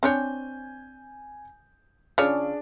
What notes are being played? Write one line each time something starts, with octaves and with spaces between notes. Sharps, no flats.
C4 D4 C#5 G#5 G6
C#3 D4 F4 G#4 C#5